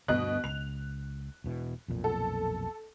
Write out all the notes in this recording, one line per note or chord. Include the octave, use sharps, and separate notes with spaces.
D2 G2 B2 B3 D#5 F#6
C#2 F7
E1 B2 E3
B1 F2 A#2
A4